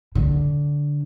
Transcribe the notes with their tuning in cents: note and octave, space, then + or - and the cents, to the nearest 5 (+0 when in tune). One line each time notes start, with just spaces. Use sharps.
D3 -15